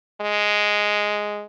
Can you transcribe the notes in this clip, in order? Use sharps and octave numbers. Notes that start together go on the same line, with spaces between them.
G#3